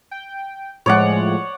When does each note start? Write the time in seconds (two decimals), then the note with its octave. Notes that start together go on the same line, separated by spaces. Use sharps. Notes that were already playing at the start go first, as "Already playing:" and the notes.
0.11 G5
0.86 A2 F3 G#3 C#5 D5 F#5